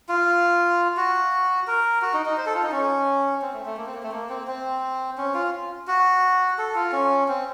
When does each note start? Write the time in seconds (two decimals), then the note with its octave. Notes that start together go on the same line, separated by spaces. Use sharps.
0.09 F4
0.97 F#4
1.67 A#4
2.02 F#4
2.14 D#4
2.26 D#4
2.37 C5
2.46 A4
2.55 F4
2.63 D#4
2.72 C#4
3.42 C4
3.53 A3
3.66 A3
3.77 A#3
3.86 C4
3.95 A#3
4.03 A3
4.12 A#3
4.30 C4
4.47 C4
5.18 C#4
5.34 F4
5.88 F#4
6.58 A4
6.75 F4
6.92 C#4
7.28 C4